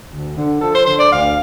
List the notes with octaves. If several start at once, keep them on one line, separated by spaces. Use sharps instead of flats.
D2
D3
F3 A4
C5
D3 C5
D5
D2 F5